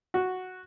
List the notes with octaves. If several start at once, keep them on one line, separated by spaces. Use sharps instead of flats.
F#4